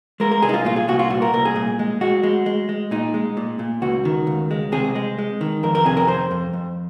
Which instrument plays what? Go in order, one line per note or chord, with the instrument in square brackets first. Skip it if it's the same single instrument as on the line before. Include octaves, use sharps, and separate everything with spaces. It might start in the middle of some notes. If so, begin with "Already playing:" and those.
[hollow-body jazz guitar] G#3 A#4
A#4
C2 G#4
D#4
F4
A#2 F4
G#4
C2 F#4
F4
A#2 F#4
A#4
C2 A#4
G#4
A#2
G#3
G#3 F#4
G#3
G#3
G#3
A#2 D#4
G#3
A#2
A#2
C#2 F#4
D#3
C#2
G#3
C3 G#4
G#3
G#3
D#3
F2 A#4
A#4
C3 G#4
A#4
F2 C5
F2
F2